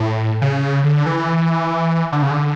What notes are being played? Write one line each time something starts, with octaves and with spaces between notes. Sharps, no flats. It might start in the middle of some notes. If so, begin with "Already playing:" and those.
Already playing: A2
C#3
D3
E3
D3
C#3
D3